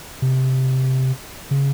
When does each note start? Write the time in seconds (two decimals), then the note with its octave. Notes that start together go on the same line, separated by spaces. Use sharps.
0.22 C3
1.51 C#3